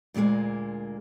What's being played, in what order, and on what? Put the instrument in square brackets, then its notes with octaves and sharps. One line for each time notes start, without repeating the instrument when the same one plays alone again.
[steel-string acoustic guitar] D2 A#2 E3 G#3 A#3